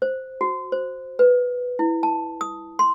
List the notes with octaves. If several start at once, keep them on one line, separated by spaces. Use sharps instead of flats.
C5
F#4
C5
B4
E4
A5
D#6
C6